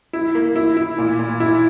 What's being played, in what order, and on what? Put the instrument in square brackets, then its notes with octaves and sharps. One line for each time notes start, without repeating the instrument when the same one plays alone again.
[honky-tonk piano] E4
A#3
E4
E4
A#2
A#2
E4